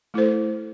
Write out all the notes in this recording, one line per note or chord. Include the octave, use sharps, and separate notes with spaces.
A3 E4 A4 C5